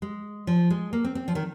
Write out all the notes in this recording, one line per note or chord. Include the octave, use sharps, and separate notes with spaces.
G#3
F3
G#3
A#3
C4
C4
F3
D#3